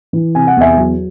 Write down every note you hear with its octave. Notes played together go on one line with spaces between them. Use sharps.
E3
C3 G#5
F#5
E2 E5 G#5
F#3